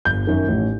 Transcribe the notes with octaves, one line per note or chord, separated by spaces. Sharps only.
G1 G6
F#2 D#3
A1